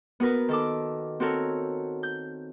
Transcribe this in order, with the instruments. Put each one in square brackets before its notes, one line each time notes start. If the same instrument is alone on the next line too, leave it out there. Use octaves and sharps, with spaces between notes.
[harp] B3 F#4 A#4 B4
D#3 A4 D6
C4 F#4 A4 A#4 C#5
G6